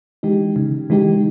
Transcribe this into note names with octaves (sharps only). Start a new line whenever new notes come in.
E3 G#3 D#4 G4
C#3
E3 G#3 D#4 G4